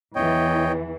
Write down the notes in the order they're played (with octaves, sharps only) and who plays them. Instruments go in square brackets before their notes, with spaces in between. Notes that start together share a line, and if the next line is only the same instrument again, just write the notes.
[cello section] E2 E3 [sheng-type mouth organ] C#5 D#5 G5